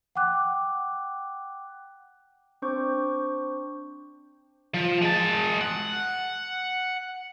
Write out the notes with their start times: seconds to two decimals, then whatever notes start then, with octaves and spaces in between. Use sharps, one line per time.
0.16 F#5 G5 D6 F#6
2.62 C4 D4 C5 C#6 D6 G6
4.75 F3
5.02 G#3 A5
5.61 F#5